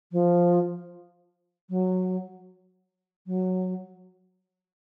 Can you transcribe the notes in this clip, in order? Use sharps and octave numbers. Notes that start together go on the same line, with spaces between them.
F3
F#3
F#3